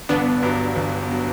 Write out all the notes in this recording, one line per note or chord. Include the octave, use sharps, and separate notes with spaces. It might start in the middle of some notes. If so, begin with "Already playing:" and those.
G1 B3 D4
G2 F#3
G1
F#3